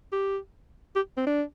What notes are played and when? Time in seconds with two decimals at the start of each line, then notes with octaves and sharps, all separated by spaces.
0.12 G4
0.96 G4
1.17 C4
1.27 D4